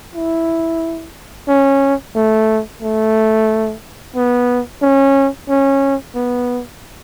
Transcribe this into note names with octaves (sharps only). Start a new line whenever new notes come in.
E4
C#4
A3
A3
B3
C#4
C#4
B3